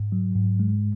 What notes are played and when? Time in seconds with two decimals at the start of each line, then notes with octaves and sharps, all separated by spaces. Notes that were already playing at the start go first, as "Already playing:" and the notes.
Already playing: G#2
0.12 F#3
0.36 G#2
0.60 G#3